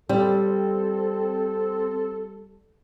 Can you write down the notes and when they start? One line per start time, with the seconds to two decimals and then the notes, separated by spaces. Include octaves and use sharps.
0.09 G3 C4 A4